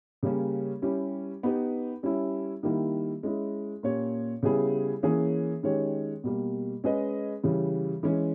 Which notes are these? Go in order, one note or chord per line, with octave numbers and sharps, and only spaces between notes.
C#3 G3 A#3 C#4
G3 C#4 E4 G4
B3 D#4 G4 B4
G3 C#4 E4
D#3 G3 A#3 E4
G#3 C#4 E4
A#2 A#3 C#4 G4 C#5
C#3 G3 B3 E4 G#4
E3 A#3 C#4 G#4 C#5
D#3 G#3 C#4 G4 C#5
B2 G3 A#3
G#3 C#4 G#4 B4 D#5
C#3 E3 G3
E3 G#3 C#4